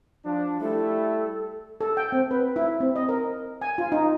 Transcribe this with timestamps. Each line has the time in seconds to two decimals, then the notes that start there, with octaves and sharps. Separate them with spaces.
0.24 F3 D4
0.61 G3 A3 E4 A4
1.81 A4
1.97 G5
2.12 C4
2.31 B4
2.56 E4
2.80 C4
2.96 D#5
3.09 A#4
3.62 G#5
3.78 F4
3.92 D#4